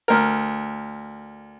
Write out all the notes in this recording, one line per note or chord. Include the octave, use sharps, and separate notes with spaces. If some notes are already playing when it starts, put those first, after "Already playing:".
D2 A#4